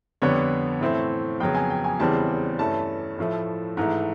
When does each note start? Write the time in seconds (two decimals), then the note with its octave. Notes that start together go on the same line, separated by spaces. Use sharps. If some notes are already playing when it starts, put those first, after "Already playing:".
0.22 F2 D3 G3 B3 C#5
0.81 A2 E3 A3 C4
1.40 F2 C#3 F#3 B3 G5
1.55 G#5
1.70 G5
1.84 G#5
1.99 E2 C#3 E3 G3 C4 A5
2.59 G2 E3 A3 C#4 A5
3.18 A2 F3 A3
3.77 G#2 E3 A3 A#5